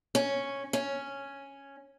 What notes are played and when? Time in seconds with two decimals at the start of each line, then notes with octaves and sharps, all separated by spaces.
0.15 C#4
0.73 C#4